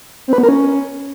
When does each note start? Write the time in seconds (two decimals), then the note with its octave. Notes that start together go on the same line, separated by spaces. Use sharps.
0.28 C4
0.33 B4
0.38 B3
0.43 A#4
0.49 C#4